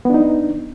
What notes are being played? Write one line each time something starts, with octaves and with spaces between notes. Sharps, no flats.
B3 D4 D#4